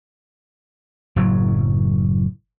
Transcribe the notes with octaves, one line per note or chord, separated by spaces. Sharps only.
F#1 A2 F#3